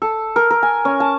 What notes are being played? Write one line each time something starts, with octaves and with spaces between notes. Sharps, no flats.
A4
A#4
A#4
G#5
C#4
A5